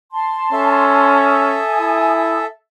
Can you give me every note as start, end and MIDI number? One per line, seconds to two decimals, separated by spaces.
0.11 1.17 81
0.11 1.17 84
0.53 1.60 61
0.53 2.46 69
0.53 2.46 76
1.24 2.45 80
1.24 2.45 87
1.80 2.44 64